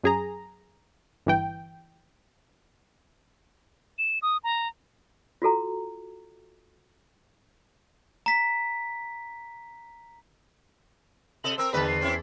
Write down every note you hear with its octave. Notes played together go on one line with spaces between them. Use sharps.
F#2 G#4 A#5
G1 E3 G5
E7
D#6
A#5
F4 F#4 A4 A#5
A#5 B6
C3 A4 D#5 F#7
C4 A#4 E6
E2 D3 B4 A5 B5
C7
C4 C#4 E4